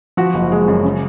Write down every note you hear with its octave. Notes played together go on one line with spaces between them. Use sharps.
F3 F#4
F#1
G#3
F#2
C#3